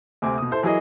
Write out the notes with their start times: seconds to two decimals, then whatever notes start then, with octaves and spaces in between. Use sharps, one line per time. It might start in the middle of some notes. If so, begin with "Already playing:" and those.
0.22 D2 C3 C4 G#5 D6
0.38 B2 D#6
0.51 E4 A4 C5
0.63 E3 F#3 E4 G#4 A#4 D#5